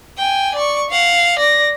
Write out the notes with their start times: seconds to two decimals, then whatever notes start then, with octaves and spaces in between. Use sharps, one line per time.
0.17 G5 G#5
0.55 D5 C#6
0.90 F5 F#5
1.39 D5 A#6